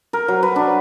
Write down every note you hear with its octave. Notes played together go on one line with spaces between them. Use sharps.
A#4
F#3
B4
D4